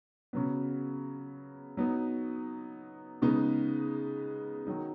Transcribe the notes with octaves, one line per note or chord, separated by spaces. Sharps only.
C#3 F#3 B3
F#3 B3 D#4
C#3 G#3 B3 D#4
D#3 F#3 D#4